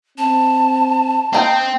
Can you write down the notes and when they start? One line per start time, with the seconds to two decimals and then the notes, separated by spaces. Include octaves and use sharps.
0.18 C4 A5
1.33 A#3 C4 D#4 G5